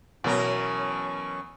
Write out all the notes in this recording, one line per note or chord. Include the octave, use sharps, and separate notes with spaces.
B2 E3 F#3 C#4 A#4 C#6